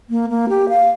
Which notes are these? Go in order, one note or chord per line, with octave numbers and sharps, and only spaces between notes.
A#3
A#3
G4
F5